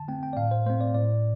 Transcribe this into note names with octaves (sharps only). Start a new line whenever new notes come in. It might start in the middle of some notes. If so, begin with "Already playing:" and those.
Already playing: D3 A5
A3 C4 G5
G5
D5
A2 F5
C5
A3 C4 C5
D5
A2 D5